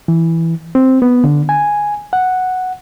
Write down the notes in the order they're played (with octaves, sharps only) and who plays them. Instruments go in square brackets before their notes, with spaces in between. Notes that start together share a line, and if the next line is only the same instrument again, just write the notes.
[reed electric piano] E3
C4
B3
D3
G#5
F#5